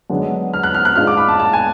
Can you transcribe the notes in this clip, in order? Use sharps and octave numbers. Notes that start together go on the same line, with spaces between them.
F#2 D3 G#3 B3 D4
F6
F#6
F6
F#6
G#2 G#3 D4 F4 F6
D6
B5
A5
A5
G#5